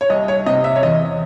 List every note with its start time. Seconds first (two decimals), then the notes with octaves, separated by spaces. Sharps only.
0.01 C#5
0.10 C2 D#5
0.28 C#5
0.46 C3 D#5
0.64 E5
0.76 C#5
0.83 E2 D#5